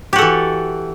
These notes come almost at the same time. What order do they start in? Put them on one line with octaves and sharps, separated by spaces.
G4 F#4 A4 E3